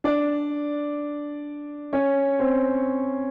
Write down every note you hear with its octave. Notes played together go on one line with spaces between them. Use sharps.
D4 D5
C#4 C#5
C4 C5